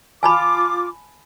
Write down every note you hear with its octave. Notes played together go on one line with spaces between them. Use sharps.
F4 G#5 A5 B5 D6